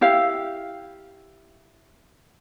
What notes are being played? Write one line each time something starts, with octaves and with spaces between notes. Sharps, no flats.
E4 G4 F5